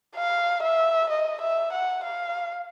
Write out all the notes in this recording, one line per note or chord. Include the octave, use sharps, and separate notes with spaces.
F5
E5
D#5
E5
F#5
F5